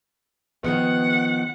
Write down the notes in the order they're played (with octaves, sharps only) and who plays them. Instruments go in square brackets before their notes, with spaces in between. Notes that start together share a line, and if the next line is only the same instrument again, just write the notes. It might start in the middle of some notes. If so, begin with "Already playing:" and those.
[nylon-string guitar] D#3 F3 B3 [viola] F#5